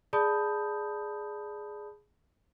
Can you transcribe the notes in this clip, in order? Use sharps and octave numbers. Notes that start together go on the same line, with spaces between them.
G#4 D5 A5 B5 D#6 G6